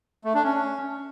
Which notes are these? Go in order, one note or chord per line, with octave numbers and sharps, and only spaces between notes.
A3
D4
C#4